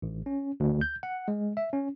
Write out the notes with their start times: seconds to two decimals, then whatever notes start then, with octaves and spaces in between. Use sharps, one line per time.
0.02 A1
0.26 C#4
0.60 D2
0.81 G6
1.03 F#5
1.28 G#3
1.57 E5
1.73 C#4